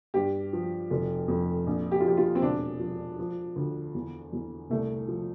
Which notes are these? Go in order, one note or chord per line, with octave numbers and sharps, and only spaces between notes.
G2 G4
F3
F1
F2
A#1
G4
F4
F3 G4
F4
C4
E1 D4
F3
F3
D2
E2
E2
C2 A3
F3